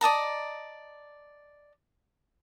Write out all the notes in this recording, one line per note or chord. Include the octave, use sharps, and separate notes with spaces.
D5 D#5 A5 A#5